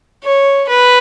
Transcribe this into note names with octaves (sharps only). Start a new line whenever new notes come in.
C#5
B4